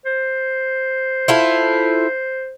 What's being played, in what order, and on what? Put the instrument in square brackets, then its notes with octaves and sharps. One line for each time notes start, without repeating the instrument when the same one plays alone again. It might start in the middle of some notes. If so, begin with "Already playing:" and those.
[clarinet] C5
[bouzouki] E4 F4 A4